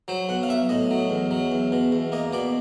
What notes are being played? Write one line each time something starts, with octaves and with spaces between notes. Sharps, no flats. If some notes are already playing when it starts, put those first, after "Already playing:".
F#3 C5
B1 F#5
F5
B1 E5
A2 D#5
F#3
E2
F#3
E2
B2
E2
A#3 D#5
B2 D5